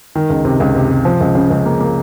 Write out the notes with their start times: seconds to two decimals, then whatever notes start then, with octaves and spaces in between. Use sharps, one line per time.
0.15 D#3
0.30 C#2
0.45 C3
0.60 C#2
0.75 C3
0.91 C3
1.05 F3
1.21 C#2
1.35 C#3
1.50 C#2
1.66 A#3
1.80 A#3